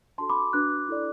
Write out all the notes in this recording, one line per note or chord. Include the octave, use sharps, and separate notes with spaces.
D4 F#4 A4 A5 C6
B5 D6
D4 F#4 B4 D6 F#6
E4 A4 D5